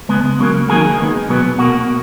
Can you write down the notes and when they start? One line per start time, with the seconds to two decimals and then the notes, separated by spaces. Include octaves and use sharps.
0.09 C#3 G#3 B3
0.39 C#3 F#3 A#3
0.69 D#3 F#3 A#3 G#4
1.00 D#3 G#3 B3
1.29 B2 F#3 B3
1.58 B2 A#3 F#4